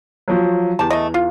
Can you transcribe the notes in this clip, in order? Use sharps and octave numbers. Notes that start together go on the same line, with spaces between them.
F3 F#3
E2 G4 A5
A3 D#5
F4